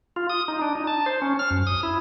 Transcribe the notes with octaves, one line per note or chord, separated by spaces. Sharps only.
F4
D#6
D#4
D4
D#4
A5
C5
C#4
F6
F#2
D#6
E4